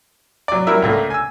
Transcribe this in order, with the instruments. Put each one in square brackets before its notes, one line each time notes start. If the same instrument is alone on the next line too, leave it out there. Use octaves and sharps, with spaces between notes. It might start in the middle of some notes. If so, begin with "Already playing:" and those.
[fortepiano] F#3 D5
F#3 G3 E4 A#4 E5
C#2 A#2 A3
G#5 E6